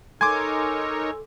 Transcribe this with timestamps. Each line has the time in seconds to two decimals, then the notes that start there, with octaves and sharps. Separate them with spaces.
0.21 D#4 A4 A#4 C#5 G#5 C6 D6 G#6